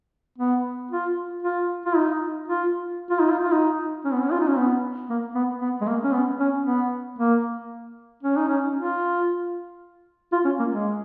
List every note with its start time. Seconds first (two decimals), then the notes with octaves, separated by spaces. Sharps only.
0.38 B3
0.91 F4
1.43 F4
1.86 F4
1.96 D#4
2.48 F4
3.10 F4
3.20 D#4
3.31 F4
3.44 F4
3.52 D#4
4.05 C#4
4.13 B3
4.22 C#4
4.32 F4
4.40 D#4
4.48 C#4
4.58 B3
5.10 A#3
5.35 B3
5.61 B3
5.81 G#3
5.88 A#3
6.04 C#4
6.13 B3
6.40 C#4
6.66 B3
7.19 A#3
8.23 C#4
8.36 D#4
8.48 C#4
8.76 F4
10.33 F4
10.45 C#4
10.59 A#3
10.72 G#3